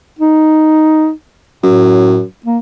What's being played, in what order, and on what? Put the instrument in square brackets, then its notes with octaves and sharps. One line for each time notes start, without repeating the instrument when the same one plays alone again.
[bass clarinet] D#4
[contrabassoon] F#2 [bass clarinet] A2
[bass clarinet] A#3